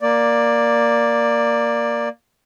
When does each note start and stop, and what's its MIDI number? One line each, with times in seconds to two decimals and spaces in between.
0.01 2.09 58
0.01 2.09 74